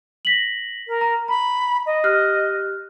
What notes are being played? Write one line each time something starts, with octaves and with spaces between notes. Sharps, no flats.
A#6 B6 F#7
A#4
A#5
A#5 B5
D#5
G4 F6 F#6